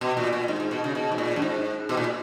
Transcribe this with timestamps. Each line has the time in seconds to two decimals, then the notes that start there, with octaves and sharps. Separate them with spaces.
0.01 B2
0.17 A#2
0.33 A#2
0.48 G#2
0.60 G#2
0.71 B2
0.84 C#3
0.95 B2
1.12 G#2
1.18 A#2
1.36 F#2
1.42 G#2
1.89 B2
1.97 A#2